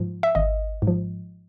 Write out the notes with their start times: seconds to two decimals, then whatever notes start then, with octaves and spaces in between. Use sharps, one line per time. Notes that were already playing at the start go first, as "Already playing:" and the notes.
Already playing: G#2 F3
0.23 E5
0.35 G#1 D#5
0.82 G#2
0.87 F3